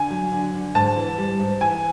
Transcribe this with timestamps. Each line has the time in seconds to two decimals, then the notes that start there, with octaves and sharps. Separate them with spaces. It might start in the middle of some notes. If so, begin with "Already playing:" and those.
Already playing: D3 G#5
0.11 F#3
0.32 D3
0.54 D3
0.75 G#2 A5
0.96 E3
1.18 G3
1.39 G#2
1.61 E3 G#5